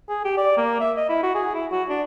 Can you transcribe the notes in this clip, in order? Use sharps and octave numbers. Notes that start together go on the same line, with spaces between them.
G#4
G4
D5
A#3
E5
D#5
E4
F#4
G#4
E4
F#4
D4